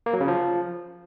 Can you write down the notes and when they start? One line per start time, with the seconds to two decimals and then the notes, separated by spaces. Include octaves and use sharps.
0.06 A#3
0.13 F#3
0.21 C#3
0.28 F3